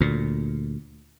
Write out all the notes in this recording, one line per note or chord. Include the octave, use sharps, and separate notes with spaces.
D2 A#2